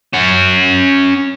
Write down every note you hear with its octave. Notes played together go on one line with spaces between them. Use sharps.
C#4 F#5